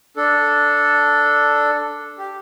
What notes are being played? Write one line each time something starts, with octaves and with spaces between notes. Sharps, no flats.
D4 A4
G4